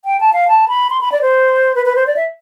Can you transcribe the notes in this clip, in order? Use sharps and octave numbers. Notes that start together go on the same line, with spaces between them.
G5
A5
F5
A5
B5
C6
B5
D5
C5
B4
B4
C5
D5
E5